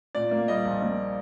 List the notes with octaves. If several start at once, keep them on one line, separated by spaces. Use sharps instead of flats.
A#2 D5
A#3
G3 D#5
A#1
A#3